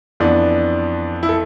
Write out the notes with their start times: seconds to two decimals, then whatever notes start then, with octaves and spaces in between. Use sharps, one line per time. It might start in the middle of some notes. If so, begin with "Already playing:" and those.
0.20 F2 E3 B3 D4
1.23 E4
1.29 A4